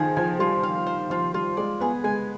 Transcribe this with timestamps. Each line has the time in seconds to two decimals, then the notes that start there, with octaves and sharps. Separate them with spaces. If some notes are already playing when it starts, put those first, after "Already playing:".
Already playing: D#3 F3 G#4
0.16 F3 G#5
0.39 G3 F4
0.63 F3 F5
0.87 C5
1.10 F3 F4
1.34 G3 F4
1.57 G#3 D5
1.81 B3 G#4
2.04 G#3 G#5